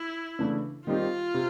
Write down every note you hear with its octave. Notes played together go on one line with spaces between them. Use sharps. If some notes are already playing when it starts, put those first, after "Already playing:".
Already playing: E4
C#3 E3 A3 D4
D#3 G3 C4 D#4 F4 G4
C3